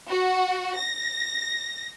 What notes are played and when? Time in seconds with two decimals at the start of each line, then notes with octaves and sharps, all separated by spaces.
0.10 F#4
0.77 A#6